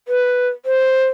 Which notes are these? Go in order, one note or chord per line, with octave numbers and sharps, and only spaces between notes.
B4
C5